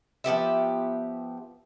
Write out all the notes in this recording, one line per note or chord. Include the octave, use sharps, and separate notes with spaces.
F3 B3 G4 E5